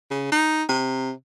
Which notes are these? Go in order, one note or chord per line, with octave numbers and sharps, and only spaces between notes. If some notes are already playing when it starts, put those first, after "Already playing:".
C#3
D#4
C3